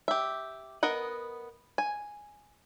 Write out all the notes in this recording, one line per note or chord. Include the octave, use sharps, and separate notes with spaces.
G4 E5
B3 A#4 D#5 F#5
G#5